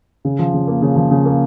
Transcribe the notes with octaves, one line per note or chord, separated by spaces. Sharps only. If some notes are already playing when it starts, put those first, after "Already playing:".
C#3
F3
C#3
A#3
C#3
F3
C#3
A#3